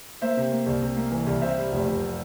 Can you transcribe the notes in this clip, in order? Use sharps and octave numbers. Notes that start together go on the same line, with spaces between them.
A#3 C5 E5
C3
A#3
C2
C3
A#3
E3
C2
C3 C5 E5
G3
F1
F1